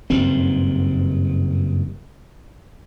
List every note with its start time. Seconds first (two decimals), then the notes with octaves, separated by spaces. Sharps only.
0.10 F#1 G2 D#3 C4